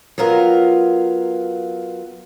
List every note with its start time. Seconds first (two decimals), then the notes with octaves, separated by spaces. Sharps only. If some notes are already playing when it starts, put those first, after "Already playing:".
0.18 F#3 B3 F4 A#4